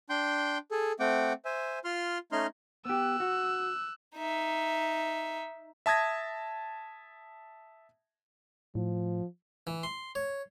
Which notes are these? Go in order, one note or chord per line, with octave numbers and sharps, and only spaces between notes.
D4 G5 C6 G6
G#4 A4
A3 C4 F#5 G5 D6
C5 E5 G#5
F4 C6 F6
A3 C#4 D#4 D#5 C6 F6
B3 G4 E6 F#6
F#4
D#4 E5
E5 A5 D#6 G#6 A#6
A2 F3
E3
C6
C#5